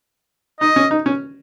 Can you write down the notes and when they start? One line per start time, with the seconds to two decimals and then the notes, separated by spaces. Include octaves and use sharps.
0.61 D#4 D#5
0.76 C#4
0.91 D#4
1.06 C#4